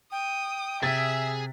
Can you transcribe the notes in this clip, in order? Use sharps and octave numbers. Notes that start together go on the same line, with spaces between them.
G5 D#6
C3 G#4 E5 G#5 A6 B6